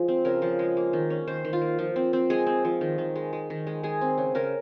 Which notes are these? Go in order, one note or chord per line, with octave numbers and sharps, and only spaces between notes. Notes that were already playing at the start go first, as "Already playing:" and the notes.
Already playing: F3 G#3
C4
C#3 A#4
F3
G#3
A#3
D#3
C#4
D#3 C5
D#3
F4
A#3
F3
C4
C4
G#3 G#4
C4
F3
D#3
D#3
G#3
G#3
D#3
G#3
G#3 G#4
C4
C#3
C#3 A#4